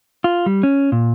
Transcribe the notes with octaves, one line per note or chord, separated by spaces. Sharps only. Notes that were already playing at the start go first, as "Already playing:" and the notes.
F4
G3
C#4
A#2